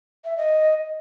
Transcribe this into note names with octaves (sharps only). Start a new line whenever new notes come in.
E5
D#5